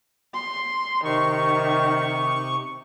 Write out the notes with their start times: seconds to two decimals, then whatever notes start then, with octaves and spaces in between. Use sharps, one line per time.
0.34 C6
1.05 C3 D#3 C#6